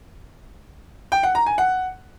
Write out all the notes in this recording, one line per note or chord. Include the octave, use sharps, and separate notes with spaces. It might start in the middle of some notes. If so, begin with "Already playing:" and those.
G5
F#5
A#5
G#5
F#5